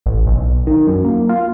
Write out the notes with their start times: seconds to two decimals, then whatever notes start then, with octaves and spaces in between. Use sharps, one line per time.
0.06 A1
0.26 B1
0.67 D#3
0.87 F#2
1.04 A#3
1.29 F4